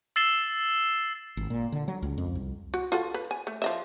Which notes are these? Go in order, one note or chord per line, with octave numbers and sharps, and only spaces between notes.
E6 A6 C7 E7 G7
G#1
A#2
D3
F#3
C#2
F2
C2
F#4
F4 F#4 A4
B4
G#5
A3
F3 D#5 E5